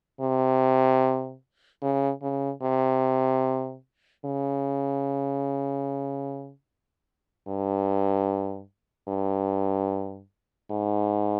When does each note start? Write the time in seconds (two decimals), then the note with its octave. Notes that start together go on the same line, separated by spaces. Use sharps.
0.21 C3
1.82 C#3
2.22 C#3
2.62 C3
4.25 C#3
7.48 G2
9.08 G2
10.71 G#2